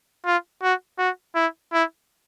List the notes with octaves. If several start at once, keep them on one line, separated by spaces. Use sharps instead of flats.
F4
F#4
F#4
E4
E4